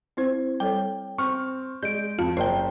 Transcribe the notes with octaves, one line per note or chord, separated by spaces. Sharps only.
C4 E4 C5
G3 A4 C#5 G5
C4 C#6 F6
G#3 D5 D#5 G6 D7
F2 F4
F#1 A#4 C5 D5 D#5 G5